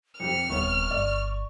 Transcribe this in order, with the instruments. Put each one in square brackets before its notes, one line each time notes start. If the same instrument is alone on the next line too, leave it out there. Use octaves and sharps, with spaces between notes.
[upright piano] F2 C3 G4 [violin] F6 [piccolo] C#7
[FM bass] D#1 [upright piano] C2 B3 C#5 [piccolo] C#6
[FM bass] G1 [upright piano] D5